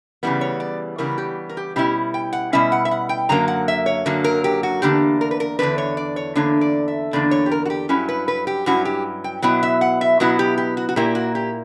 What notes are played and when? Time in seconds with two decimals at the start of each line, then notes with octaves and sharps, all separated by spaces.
0.23 C#3 E3 G3 B3
0.41 C#5
0.60 D5
0.98 C#3 E3 G3 B3 A#4
1.18 G4
1.49 A#4
1.57 G4
1.76 B2 G3 C#4 E4 G4
2.14 G5
2.33 F#5
2.53 B2 G3 C#4 E4 E5
2.72 F#5
2.85 E5
2.91 F#5
3.09 G5
3.29 F#2 D3 F#3 A#3 A#5
3.48 F#5
3.68 E5
3.86 C#5
4.06 F#2 D3 F#3 A#3
4.24 A#4
4.44 G4
4.63 F#4
4.82 E2 D3 A#3 D4 G4
5.21 A#4
5.31 B4
5.40 A#4
5.59 E2 D3 A#3 D4 B4
5.78 C#5
5.97 D5
6.16 C#5
6.36 E2 D3 A#3 D4 C#5
6.61 D5
6.88 E5
7.13 E2 D3 A#3 D4 D5
7.31 C#5
7.46 G4
7.51 A#4
7.65 F#4
7.70 G4
7.89 G2 F#3 C#4 E4 G4
8.09 B4
8.28 B4
8.47 G4
8.66 G2 F#3 C#4 E4 F#4
8.85 G4
9.24 G5
9.42 B2 F#3 B3 E4 G5
9.63 E5
9.81 F#5
10.01 E5
10.20 B2 F#3 B3 E4 F#4
10.39 G4
10.58 G4
10.77 F#4
10.89 F#4
10.96 A#2 A#3 E4 G4
11.15 F#4
11.35 G4